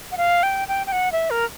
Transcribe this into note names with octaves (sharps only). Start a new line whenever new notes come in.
F#5
F5
G5
G5
G5
F#5
E5
A#4